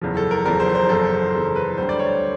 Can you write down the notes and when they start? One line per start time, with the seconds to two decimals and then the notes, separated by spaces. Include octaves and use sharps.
0.01 F#1 E2 C#3 F3
0.17 A4
0.31 A#4
0.45 F#1 E2 C#3 F3 A#4
0.60 C5
0.75 C5
0.89 F#1 E2 C#3 F3 A4
1.34 F#1 E2 C#3 F3
1.56 B4
1.78 D2 D3 G3 C5
1.89 D5
1.99 C#5